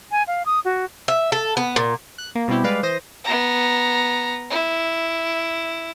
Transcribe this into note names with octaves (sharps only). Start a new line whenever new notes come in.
G#5
F5
D#6
F#4
E5
A4
B3
A#2
F#6
A#3
B2 G3 B3 C4 E4 G4
G3 G#3 B4 D5 F5
E3 C5 D#6 A#6
B3 A#5
E4